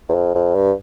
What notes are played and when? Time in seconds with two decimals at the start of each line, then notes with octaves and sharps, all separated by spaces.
0.09 E2
0.14 F2
0.35 F2
0.55 G2